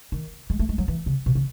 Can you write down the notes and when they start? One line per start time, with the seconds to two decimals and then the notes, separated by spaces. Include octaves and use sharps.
0.12 D#3
0.50 G#3
0.59 A3
0.69 G#3
0.78 F#3
0.88 E3
1.06 C#3
1.26 B2
1.35 C#3